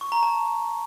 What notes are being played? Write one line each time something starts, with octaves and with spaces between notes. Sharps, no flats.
C#6
A#5
A5